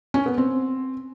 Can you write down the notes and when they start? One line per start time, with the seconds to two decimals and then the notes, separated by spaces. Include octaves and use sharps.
0.14 C#4
0.26 B3
0.38 C4